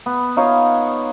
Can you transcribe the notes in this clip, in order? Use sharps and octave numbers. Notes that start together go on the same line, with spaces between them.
B3
D#4 F4 C#5 F5